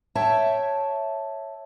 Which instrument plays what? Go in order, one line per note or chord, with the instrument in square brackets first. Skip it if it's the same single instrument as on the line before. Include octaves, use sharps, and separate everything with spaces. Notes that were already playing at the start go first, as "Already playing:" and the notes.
[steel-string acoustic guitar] C#5 E5 G5 A5